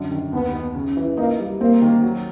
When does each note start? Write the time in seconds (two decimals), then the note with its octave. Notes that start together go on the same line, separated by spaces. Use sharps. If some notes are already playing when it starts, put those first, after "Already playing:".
Already playing: F#2 D3
0.11 D#3
0.33 D#2 B3
0.53 D#3
0.75 C#3
0.97 E3
1.17 A#3 D#4
1.39 G3
1.60 A#3 C4
1.82 D#3
2.02 F#3